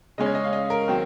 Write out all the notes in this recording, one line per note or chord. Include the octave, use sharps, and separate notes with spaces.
C#3 G#3 C#4 D#5
C#5
D#5
F5
D#5
A#4
D#3 F#3 C4